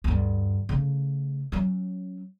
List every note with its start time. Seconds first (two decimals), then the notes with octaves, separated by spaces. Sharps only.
0.04 D2 G2
0.69 C#3 A3
1.52 F#3 C#4